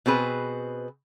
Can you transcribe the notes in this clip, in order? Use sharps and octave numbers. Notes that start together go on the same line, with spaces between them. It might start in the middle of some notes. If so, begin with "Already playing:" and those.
B2 C4 G#4 B4